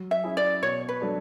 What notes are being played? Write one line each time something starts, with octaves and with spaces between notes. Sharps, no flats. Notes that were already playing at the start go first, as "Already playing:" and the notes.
Already playing: F#3
E5
C#4 E4 G#4
D5
B2 C#5
B4
F#3 A3 D4